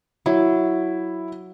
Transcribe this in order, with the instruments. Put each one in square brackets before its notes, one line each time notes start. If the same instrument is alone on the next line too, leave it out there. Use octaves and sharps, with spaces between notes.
[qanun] F#3 [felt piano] E4